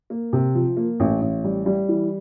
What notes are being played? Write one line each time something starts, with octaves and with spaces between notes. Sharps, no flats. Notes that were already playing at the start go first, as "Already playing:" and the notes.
A#3
C3
F3
A#3
A1
A1
G3
G3
E3